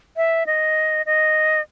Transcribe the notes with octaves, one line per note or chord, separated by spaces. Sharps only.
E5
D#5
D#5